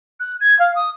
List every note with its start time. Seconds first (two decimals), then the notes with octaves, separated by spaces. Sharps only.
0.20 F#6
0.40 G#6
0.59 F5
0.75 D#6